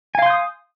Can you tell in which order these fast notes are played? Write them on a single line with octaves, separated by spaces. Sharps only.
G#5 F5 C6 G6 D#6